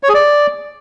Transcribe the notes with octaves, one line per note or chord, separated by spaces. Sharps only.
C#5
G#4
D5